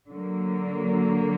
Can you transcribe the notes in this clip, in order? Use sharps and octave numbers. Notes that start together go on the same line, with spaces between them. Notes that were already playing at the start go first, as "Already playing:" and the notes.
D3 F#3 A#3